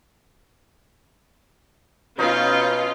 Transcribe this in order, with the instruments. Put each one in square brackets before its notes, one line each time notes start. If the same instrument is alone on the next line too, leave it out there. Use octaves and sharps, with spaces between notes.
[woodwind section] B2 [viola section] C#4 F4 [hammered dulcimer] D#4 D#5 F5